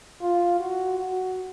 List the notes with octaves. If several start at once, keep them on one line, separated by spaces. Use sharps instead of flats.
F4
F#4
F#4